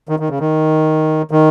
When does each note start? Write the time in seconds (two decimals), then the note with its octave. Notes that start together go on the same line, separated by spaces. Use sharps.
0.09 D#3
0.20 D#3
0.30 C#3
0.40 D#3
1.31 D#3